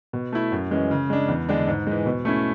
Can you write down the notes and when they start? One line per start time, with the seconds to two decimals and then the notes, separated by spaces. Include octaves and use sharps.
0.13 B2
0.32 A3 E4
0.52 F#2
0.71 E3 G#3 C#4
0.91 C#3
1.10 G#3 D4
1.28 E2
1.49 D3 G#3 D4
1.67 G#2
1.87 E3 G#3
2.06 B2
2.25 A3 C#4 E4